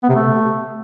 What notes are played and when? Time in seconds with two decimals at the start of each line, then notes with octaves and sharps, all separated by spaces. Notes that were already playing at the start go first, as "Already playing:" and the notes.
0.03 B3
0.09 C3
0.15 A3